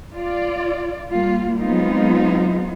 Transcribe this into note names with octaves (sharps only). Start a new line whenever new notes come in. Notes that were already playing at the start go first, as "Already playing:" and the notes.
F4 D5
G3 A#3 F4
F#3 G#3 B3 C4 D#4 F4